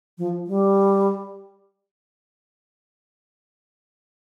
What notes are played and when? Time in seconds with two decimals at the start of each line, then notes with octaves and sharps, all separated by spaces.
0.18 F3
0.47 G3